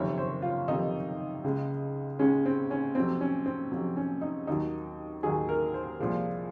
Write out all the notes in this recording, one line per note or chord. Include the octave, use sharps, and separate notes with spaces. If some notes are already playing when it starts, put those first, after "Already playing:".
Already playing: F#1 F2 C3 D#3 C#5
C5
F4
F#1 F2 C3 D#3 D#4
C#2 C#3 G#3
C#2 C#3 G#3 C#4
C4
C#4
F2 C3 F#3 C4
C#4
C4
F2 C3 F#3
C#4
D#4
D#2 D#3 F#3 D#4
D#2 D#3 F#3 G#4
A#4
C5
C2 A#2 F3 G#3